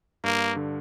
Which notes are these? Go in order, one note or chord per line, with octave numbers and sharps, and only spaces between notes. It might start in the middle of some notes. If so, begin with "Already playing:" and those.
G2 A#3
D3